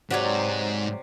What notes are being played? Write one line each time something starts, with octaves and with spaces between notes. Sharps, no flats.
G#2 C3 F#3 B4 C#5 D5 F#5